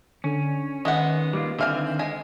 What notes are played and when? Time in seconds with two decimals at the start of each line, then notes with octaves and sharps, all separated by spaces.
0.24 D3 C#4
0.85 D#3 G#3 B3 F#5
1.33 G3 A#3 F4
1.59 D3 E3 C4 F5 G#5
1.99 G#3 G#5